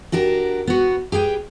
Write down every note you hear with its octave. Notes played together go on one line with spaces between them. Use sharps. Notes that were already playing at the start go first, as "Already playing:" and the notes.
D4 F#4 G4 A#4
B3 F#4
G4 G#4 B4 G5